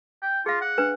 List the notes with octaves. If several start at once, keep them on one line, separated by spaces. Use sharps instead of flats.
G5
F4 G#4 F5
F#5
D4 B4